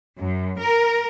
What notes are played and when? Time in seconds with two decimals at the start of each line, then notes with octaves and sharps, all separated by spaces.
0.18 F#2
0.58 A#4